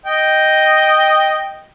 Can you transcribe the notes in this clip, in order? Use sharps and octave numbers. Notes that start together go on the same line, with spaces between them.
D#5 G5